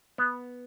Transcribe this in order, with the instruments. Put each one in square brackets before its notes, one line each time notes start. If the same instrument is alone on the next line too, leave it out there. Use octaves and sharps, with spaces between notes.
[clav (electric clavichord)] B3